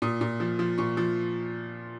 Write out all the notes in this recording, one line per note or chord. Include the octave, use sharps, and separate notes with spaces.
A#2 D#6
A#2
F3
F3
A#2 C#6
F3